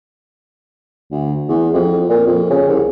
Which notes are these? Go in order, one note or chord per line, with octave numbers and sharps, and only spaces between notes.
D2
E2
F2
A#2
F2
C#3
C2